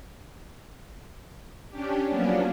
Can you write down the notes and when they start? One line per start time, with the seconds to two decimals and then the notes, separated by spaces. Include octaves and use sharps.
1.69 C#4 D4 G4
2.07 F3 F#3 A#3 B3 C#4 D4